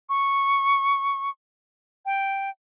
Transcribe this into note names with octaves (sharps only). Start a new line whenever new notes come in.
C#6
G5